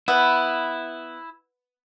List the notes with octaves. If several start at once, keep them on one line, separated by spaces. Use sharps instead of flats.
B3 E4